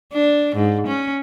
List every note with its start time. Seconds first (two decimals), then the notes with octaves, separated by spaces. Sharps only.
0.13 D4
0.56 G#2
0.87 C#4